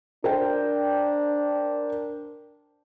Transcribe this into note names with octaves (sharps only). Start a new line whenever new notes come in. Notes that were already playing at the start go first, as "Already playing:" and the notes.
D4 A#4 C5 G5